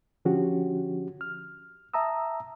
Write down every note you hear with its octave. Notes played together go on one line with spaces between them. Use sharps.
D3 F3 C#4 F#4 G4
F6
E5 A5 A#5 D#6 E6